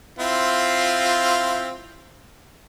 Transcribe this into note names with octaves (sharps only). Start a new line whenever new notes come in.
C4 E4 F4